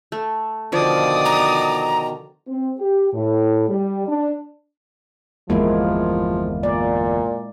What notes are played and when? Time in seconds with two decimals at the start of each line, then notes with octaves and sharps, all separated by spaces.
0.12 A3
0.72 B2 D3 D#3 F3 D5 D#6
1.25 A#5
2.46 C4
2.77 G4
3.12 A2
3.68 G3
4.07 D4
5.50 G1 E2 F3 G#3 A#3 E4
6.63 A#2 D5